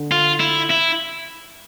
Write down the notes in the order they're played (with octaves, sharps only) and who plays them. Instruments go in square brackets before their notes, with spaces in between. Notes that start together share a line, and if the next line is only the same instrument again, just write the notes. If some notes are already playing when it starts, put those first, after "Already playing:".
Already playing: [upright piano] D3
[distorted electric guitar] F4
E4
E4